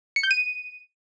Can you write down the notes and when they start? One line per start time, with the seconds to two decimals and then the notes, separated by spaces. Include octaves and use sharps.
0.16 C#7
0.23 G6
0.31 D#7